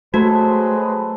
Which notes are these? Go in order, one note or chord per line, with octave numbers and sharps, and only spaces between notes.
F#3 G#3 A3 F#4 A4 B4 C5